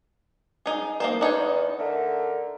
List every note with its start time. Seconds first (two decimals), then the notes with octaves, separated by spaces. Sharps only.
0.66 D#4 G#4
1.00 A#3 B3 D#4 C5
1.21 E2 D4 D#4 C#5
1.79 D3 A3 A#4